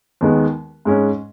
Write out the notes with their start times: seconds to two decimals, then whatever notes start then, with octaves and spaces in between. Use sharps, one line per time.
0.21 D#2 D#3 G#3 B3
0.85 G#2 G#3 C#4